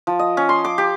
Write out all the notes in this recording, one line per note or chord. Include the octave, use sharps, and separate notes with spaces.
F3
D#5
C#4
C6
D6
G4